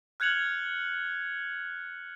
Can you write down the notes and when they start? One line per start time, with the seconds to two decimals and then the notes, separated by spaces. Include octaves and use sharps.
0.20 F6 F#6 G#6 C#7 F7 F#7